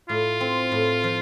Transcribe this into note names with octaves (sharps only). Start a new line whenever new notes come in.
A2 F4
C4
A2
F3